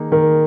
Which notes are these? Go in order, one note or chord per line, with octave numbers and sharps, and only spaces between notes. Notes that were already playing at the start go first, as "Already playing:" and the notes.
Already playing: D#3 A#3 D#4 G#4
D#3 A#4